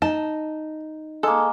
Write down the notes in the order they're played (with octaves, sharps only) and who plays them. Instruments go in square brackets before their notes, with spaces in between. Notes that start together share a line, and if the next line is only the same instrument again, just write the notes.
[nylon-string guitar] D#4 [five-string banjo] A5
[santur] G#3 A#3 [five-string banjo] A4